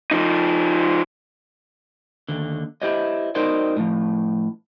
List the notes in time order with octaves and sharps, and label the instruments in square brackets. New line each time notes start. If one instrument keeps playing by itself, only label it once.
[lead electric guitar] F3 D#4
[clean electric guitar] D#2 D3
E4 G4 C5 C#5 D#5
D#4 F#4 A#4 C5 D5 D#5
A2 F3